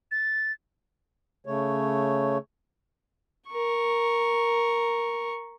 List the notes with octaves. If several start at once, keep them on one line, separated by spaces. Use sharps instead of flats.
A6
C#3 A3 C#5
A#4 C#6